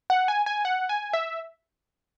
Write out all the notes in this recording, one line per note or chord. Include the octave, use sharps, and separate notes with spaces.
F#5
G#5
G#5
F#5
G#5
E5